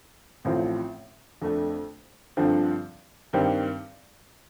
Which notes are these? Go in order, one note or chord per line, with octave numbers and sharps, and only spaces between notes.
A1 A2 F3 C4 F4
F2 D3 A3 D4
G2 D3 F3 C4
G2 D#3 G3 C4